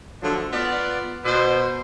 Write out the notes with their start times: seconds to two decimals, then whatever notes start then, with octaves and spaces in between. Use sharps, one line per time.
0.21 D3 F3 F#3 A3 D4
0.51 B3 F4 D5
1.25 B2 C5